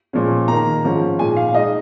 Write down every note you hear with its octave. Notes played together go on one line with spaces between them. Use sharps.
A#2 F3 G#3 C#4
D#3 A#3 D#4 A#5
G#2 F3 C#4
A#2 G#3 D#4 G#5
F5
G#3 D#4 D#5